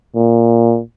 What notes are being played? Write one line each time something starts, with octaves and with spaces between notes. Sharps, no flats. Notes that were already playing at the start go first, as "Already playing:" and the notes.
A#2